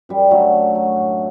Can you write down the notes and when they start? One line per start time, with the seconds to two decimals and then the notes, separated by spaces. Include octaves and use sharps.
0.09 F#2 G3
0.31 D3 F#3 A3
0.53 F#2
0.75 F#3
0.96 A2